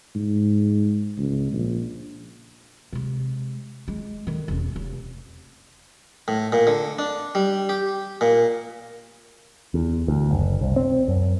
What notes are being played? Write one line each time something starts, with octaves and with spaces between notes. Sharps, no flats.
G#2
C#2
A#1
C3 G#3
G#3
D3 D#3
E1 C#4
F1
A2
A#2
D3
D4
G3
G4
A#2
E2
D2
F#1
C2
C4
F#2